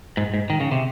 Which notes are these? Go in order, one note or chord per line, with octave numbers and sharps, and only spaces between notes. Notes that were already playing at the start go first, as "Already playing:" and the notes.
G#2
G#2
D#3
C#3
C3